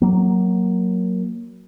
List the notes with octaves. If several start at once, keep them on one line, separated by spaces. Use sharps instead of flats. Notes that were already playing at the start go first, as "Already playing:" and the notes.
F#3 A#3